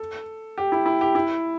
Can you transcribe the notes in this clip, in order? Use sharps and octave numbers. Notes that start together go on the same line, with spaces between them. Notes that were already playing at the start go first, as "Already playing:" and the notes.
Already playing: A4
G4
E4
E4
G4
E4